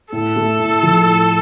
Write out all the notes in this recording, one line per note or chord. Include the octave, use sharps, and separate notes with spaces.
A2 A4
A3
A2
F3
A2